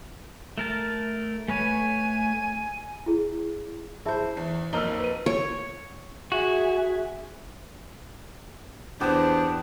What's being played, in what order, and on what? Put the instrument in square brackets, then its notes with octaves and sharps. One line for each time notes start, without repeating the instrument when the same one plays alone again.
[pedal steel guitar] A3 A#4 A5
[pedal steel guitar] A3 B4 C#5 [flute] G#5
[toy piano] E4 G#4
[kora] E4 C5 [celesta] G#4 E5 A5
[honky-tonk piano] E2 [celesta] C7
[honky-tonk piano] B1 F2 A#3 [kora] D#4 [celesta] E6 F6 G7
[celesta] B4 D#7
[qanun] C#5
[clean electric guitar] F#4 [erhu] G#4 [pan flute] E5
[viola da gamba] E2 [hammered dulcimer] B3 G4 [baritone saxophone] D4 [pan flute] C5